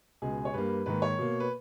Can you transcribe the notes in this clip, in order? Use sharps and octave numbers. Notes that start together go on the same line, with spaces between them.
C#2 B2 G#3 G#4
C#5
G2 G3 A#3 B4
G#2 D#3 A#3 B4
C#5
B2 A#3
B4